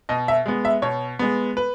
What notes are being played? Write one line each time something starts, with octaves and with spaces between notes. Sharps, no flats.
B2 D#5
E5
G#3 B3
E5
B2 C#5
G#3 B3
B4